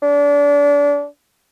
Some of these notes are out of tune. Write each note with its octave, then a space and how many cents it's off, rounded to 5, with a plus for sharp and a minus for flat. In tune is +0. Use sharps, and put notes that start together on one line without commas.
D4 -30